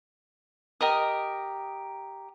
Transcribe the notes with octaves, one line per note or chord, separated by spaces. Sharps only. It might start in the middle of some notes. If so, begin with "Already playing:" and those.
G4 A#4 D#5 D#6